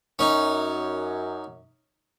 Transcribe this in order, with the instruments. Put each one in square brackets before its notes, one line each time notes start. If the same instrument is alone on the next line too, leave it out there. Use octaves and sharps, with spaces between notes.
[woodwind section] F#2 [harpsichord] C#4 D#4